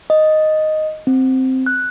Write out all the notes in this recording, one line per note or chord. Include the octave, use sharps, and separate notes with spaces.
D#5
C4
F#6